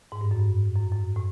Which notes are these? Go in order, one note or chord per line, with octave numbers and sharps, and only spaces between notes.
G#2
G2
F#2
G2
F#2
F#2
A2